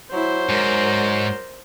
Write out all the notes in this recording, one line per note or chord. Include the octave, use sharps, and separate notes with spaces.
F#3 E4 C5
G#2 A#4 D5